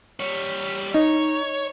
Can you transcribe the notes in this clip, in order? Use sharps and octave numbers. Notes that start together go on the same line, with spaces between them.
G3 C#5
D#4 C#5